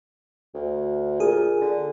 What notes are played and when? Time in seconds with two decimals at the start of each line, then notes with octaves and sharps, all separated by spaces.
0.54 D2
1.20 A#2 G#4
1.61 D3